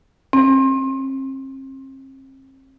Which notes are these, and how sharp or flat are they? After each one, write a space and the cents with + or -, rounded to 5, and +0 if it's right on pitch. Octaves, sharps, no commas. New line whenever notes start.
C4 +40